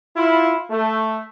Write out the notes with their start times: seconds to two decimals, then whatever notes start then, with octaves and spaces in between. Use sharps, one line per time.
0.16 E4 F4
0.70 A3